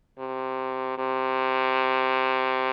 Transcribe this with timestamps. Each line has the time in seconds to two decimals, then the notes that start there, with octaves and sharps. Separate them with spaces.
0.18 C3
0.98 C3